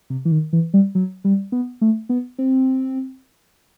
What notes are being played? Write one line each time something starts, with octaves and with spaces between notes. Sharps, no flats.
C3
E3
D#3
E3
G3
F#3
G3
B3
A3
B3
C4